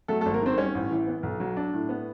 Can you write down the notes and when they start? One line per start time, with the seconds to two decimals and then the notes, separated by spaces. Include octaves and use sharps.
0.08 F#3 A3 A4
0.21 A3 A4
0.26 G#1
0.34 A#3 A#4
0.42 D#3 C4 C5
0.58 G3 C#4 C#5
0.75 A1
0.91 E3
1.07 B3
1.23 B1
1.40 F#3
1.57 D4
1.73 A2
1.89 B3